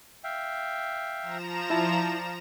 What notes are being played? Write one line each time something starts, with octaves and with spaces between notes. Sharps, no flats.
E5 F5 G5
F3 A#5 E7
E4 D5 A5